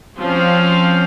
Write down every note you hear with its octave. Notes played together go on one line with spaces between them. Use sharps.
F3 C4 C#4 F5